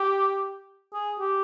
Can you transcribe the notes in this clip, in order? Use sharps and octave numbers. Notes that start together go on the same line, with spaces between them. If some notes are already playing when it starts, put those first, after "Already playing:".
Already playing: G4
G#4
G4